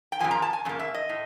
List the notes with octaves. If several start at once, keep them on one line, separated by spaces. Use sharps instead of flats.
G5
F2 C#3 F3 A#3 G#5
A#5
A5
G#5
F2 C#3 A#3
E5
D#5
A2